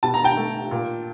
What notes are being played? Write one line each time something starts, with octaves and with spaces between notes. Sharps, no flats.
B2 A5
A#5
G5 A5
A3
A#2